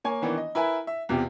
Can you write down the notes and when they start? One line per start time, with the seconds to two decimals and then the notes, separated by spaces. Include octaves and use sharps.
0.04 A#3 C#5 G#5
0.22 D#3 E3 B3 D4
0.38 D#5
0.55 E4 A#4 B4 E5 G#5
0.87 E5
1.09 E2 C3 F4 G4